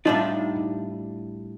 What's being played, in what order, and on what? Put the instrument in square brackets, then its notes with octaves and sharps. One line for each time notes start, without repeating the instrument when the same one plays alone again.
[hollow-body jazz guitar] A2 G3 D4 F4 [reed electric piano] D#4